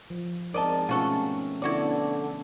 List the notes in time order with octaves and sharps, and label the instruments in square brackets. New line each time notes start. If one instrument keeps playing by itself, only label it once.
[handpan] F3
[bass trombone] G#2 [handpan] C4 D#4 A#4 [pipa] D5 D#5 A5
[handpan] B2 A3 C#4 [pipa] F4 F#4 A4
[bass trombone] D3 [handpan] B3 [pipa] E4 F#4 D5